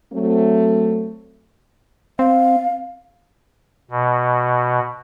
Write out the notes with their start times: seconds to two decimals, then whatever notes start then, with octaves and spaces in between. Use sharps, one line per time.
0.13 F#3 A3 C4
2.19 C4 F5
3.91 B2